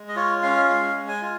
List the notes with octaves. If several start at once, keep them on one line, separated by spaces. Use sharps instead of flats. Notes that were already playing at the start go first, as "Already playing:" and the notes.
Already playing: G#3
D#5
F4 C#5
C#4 F5
G#3 F5
G#3
G#5
F4